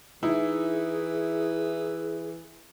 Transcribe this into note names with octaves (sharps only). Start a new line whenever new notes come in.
E3 D#4 E4 G#4